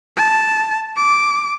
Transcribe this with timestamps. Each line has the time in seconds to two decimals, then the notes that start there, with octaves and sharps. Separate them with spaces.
0.17 A5
0.97 D6